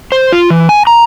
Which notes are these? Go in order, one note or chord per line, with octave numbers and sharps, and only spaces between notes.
C5
F4
E3
G#5
A#5